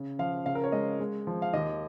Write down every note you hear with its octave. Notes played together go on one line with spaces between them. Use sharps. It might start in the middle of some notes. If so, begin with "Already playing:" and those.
Already playing: C#3
F3 F5
C#3 F5
A#4
C#5
G#3 D#5
G#3
F3
F5
D#2 D#5